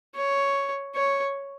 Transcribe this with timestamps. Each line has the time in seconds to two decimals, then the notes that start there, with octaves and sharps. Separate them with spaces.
0.16 C#5
0.95 C#5